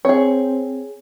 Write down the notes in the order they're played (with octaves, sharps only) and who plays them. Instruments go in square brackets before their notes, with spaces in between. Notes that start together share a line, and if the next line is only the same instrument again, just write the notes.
[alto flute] C4 [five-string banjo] G#4 C#5